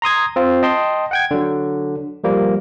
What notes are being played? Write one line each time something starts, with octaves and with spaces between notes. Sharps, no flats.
A#5 C6 D#6 G#6
C4 F4
D#5 G5 A5 C6
F#5 G5 G#6
D3 F#3
F3 G3 A#3